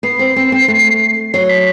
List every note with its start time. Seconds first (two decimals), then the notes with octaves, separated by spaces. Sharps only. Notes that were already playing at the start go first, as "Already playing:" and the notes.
0.03 B3 C7
0.19 C4
0.36 C4
0.52 C4
0.68 A3
1.33 F#3 C7
1.49 B6